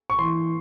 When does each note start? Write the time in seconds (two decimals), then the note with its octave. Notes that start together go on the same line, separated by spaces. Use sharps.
0.10 C#6
0.19 E3 C6